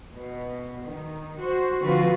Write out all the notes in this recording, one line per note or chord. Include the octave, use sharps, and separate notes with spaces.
B2
D#3
F#4 C5
D3 F3 C4 F4 F#4 B4